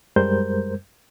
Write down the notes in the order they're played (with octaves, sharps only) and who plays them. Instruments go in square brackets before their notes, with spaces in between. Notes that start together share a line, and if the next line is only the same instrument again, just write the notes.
[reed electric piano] F#2 G3 G#3 A#4 C5 G6